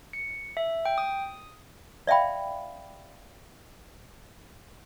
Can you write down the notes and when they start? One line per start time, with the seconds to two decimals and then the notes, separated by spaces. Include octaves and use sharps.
0.13 C#7
0.57 E5
0.85 G5
0.98 D#6
2.07 D5 E5 F5 G5 B5